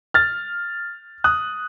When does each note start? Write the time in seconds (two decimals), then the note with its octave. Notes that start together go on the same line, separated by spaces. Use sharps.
0.14 F6 A6
1.24 D#6 F#6